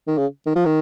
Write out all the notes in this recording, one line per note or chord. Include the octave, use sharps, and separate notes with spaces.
D#3
C#3
D#3
F3
D#3